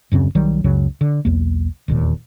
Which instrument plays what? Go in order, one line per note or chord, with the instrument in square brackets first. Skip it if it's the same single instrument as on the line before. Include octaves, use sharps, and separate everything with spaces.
[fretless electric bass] D#1 F#2 C#3 C4
B1 D#3 F#3 G3
C#2 F#2 C#3 F#3
D3
B1 E2 A#3
E1 D#2 A#2